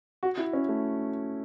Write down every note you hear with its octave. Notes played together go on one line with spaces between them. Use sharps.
F#4
E4
C#4
A3